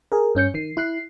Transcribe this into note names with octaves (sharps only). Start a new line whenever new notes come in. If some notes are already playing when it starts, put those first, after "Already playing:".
G#4 A#4
G2 C#4 G6 C#7
D#3 C7
E4 F#6 C7